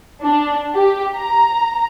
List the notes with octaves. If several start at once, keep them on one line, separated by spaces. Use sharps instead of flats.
D4
G4
A#5